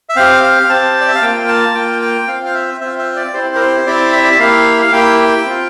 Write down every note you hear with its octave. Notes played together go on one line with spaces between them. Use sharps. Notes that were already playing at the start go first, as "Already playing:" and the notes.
E5
C4 G4 F5
F5
C4 G4 A5
D5
E5
F5
A#3 F4 G5
A5
A#3 F4 G5
G5
C4 F4 F5
F5
E5
C4 F4 E5
E5
D5
C4 E4 G4 C5
A#4
C5
C4 E4 G4 D5
E5
D5
E5
A#3 E4 G4 F5
F5
A#3 E4 G4 G5
G5
C4 F4